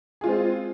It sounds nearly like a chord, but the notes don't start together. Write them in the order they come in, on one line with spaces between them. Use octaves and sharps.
G#4 F4 G#3 C4